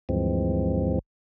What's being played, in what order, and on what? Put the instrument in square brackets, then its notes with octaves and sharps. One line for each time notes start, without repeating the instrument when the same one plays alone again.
[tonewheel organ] D2 G2 E3 F3 G#3 C4